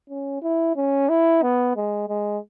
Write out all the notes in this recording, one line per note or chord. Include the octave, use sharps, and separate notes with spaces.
C#4
E4
C#4
E4
B3
G#3
G#3